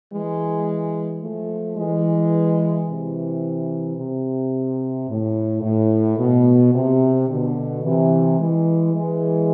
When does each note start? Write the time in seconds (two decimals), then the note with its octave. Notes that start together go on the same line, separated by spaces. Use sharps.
0.12 E3 G#3
1.22 F3 A3
1.77 E3 G#3
2.87 C3 E3
3.98 C3
5.09 A2
5.63 A2
6.18 B2
6.74 C3
7.28 B2 D3
7.83 C3 E3
8.39 E3 G#3
8.93 E3 G#3